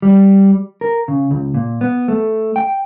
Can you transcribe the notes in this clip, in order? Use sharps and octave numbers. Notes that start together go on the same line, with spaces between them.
G3
A#4
C#3
C#2
A#2
B3
A3
G5